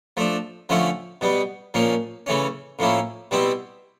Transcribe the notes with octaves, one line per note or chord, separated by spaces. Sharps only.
F3 A3 D4
D3 F3 A3 C#4 E4
B2 G3 B3
A#2 F3 A#3 C#4
C#3 E3 A3 C#4
A2 F3 A#3 C#4 E4
B2 G3 C4 E4